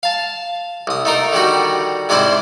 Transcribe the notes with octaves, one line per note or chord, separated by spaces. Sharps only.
F5 A5
C2 D#6
A3 D#4 A#4
D3 D#3 G3 F#4
G#2 C3 G3 E4 C5 G#5